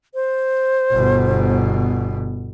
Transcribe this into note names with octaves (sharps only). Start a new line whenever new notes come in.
C5
G1 B2